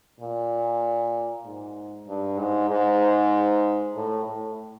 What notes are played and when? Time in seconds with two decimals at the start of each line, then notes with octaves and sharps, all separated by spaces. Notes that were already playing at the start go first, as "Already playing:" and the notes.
0.20 A#2
1.45 G#2
2.08 G2
2.39 G#2
2.70 G#2
3.95 A2
4.25 A2